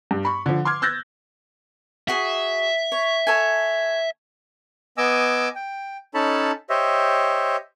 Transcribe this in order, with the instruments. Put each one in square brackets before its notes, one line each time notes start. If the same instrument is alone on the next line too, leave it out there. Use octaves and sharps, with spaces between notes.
[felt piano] G2
B5 C#6
D3 F3
C6 D6 F6 G#6
E6 F#6 G6 A6 A#6
[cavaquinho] F#4 G#4 [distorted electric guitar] E5
[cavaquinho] C#5
A4 C#5 G#5
[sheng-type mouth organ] B3 D#5 G#5 D6 E6
G5
C#4 D#4 A4 C#5 A5 B5
G4 C5 C#5 D#5 E5